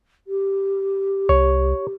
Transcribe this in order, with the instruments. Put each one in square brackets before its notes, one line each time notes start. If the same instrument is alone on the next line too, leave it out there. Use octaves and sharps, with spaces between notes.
[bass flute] G4
[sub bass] C2 [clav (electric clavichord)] C#5